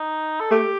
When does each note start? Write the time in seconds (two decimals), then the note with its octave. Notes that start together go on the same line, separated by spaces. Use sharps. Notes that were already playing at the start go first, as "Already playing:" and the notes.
Already playing: D#4
0.40 A4
0.51 A3 G4